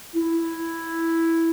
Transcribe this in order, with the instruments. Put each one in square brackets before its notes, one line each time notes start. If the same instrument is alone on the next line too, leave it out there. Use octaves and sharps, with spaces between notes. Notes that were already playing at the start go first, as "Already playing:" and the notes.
[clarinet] E4